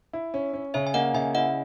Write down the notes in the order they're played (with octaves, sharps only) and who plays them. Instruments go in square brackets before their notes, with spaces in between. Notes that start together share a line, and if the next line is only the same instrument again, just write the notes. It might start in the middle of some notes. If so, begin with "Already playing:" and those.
[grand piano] E4
C#4
C#4
[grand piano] C#3 [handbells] C#5 E5
[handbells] G#5
[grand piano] A#3 [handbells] D#5 F#5
[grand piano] C#3 [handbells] E5 G#5
[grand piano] E4 [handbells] D#5 F#5